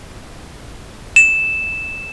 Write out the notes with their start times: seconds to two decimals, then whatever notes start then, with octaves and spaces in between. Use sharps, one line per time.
1.16 E7